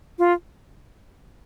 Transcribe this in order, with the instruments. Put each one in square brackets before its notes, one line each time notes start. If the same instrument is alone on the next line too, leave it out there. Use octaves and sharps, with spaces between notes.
[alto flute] F4